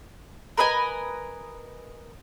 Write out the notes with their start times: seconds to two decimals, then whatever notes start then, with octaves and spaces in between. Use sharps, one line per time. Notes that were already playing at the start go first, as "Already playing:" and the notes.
0.57 A#4 B4 D#5 G#5